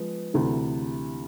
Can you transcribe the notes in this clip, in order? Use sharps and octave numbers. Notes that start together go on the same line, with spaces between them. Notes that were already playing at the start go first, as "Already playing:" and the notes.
Already playing: F3 G#3 B3
D2 C3 E3